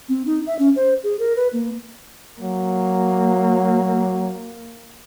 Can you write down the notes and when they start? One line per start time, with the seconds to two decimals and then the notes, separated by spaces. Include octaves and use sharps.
0.09 C4
0.26 D#4
0.47 E5
0.59 C#4
0.76 C5
1.03 G#4
1.19 A#4
1.36 B4
1.53 A#3
2.41 F#3 A#3